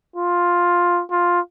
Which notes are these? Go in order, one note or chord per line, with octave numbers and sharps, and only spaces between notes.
F4
F4